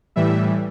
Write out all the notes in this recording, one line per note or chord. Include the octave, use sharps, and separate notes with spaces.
A2 E3 G3 E5